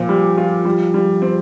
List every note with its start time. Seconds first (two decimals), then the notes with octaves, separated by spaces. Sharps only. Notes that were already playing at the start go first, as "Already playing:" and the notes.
Already playing: A#2 F3
0.09 G3
0.38 F4
0.65 G3
0.94 G3
1.22 C4